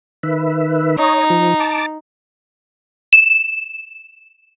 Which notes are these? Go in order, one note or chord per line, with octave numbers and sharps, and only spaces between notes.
D#3 B4 E5
D#4 C#5 D#5
F3
A5 D6
E7